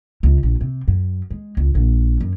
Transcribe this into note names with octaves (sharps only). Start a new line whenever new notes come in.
C#2
A#1
C3
F#2
G#3
C#2
A#1
F#2